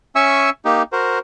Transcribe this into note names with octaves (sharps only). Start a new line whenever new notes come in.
C#4 E5 G#5 C#6 E6
A#3 D#4 G4
F#4 A#4 C5